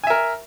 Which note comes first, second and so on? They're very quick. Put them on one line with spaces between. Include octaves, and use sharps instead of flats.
G#5 E5 A#4